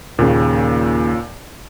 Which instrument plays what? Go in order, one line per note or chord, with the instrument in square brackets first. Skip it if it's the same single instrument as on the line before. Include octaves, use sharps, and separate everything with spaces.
[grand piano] D#2 C#3 [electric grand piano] A#2